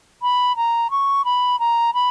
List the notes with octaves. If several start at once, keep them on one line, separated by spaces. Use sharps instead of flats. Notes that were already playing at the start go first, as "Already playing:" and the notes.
B5
A#5
C#6
B5
A#5
B5